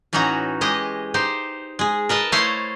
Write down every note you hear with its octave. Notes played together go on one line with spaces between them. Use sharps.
A2 E3 C#4 D#4 F#4 A#5
E3 G#3 G4 D#5
D#4 G4 C5
G#3 G#4
A#4 B4 D#5 A5
A3 E4 C5 C#5 D#5 F5